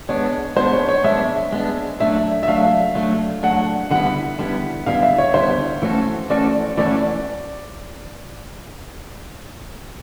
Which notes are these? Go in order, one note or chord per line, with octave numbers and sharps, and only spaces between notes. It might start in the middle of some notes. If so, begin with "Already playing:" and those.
G#3 B3 D4 C#5
G#3 B3 D4 C5
C#5
C#5
G#3 B3 D4 E5
G#3 B3 D4
F#3 A3 D4 E5
E5
F#3 A3 D4 F5
F#3 A3 D4
F#3 A3 D4 F#5
D3 G3 B3 E4 F#5
D3 G3 B3 E4
D3 G3 B3 E4 F5
E5
C#5
D3 G3 B3 E4 C5
E3 A3 C#4 F#4 A4
E3 A3 C#4 F#4 A4 D5
E3 A3 C#4 F#4 A4 D5